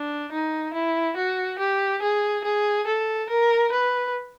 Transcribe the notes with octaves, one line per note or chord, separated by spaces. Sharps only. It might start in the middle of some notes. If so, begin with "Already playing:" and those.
Already playing: D4
D#4
E4
F#4
G4
G#4
G#4
A4
A#4
B4